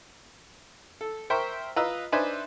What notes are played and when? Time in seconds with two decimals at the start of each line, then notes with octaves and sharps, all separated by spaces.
1.01 A4
1.30 A#4 C5 E5 G5 C#6
1.76 F4 B4 D#5 A#5 E6
2.12 D4 D#4 B4 C5 E5 G#5